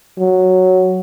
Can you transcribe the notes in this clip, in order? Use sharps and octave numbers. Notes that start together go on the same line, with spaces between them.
F#3